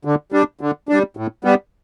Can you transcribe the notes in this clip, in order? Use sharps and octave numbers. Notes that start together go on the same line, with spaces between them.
D3
G3 D4
D3
G3 D4
A2
G3 B3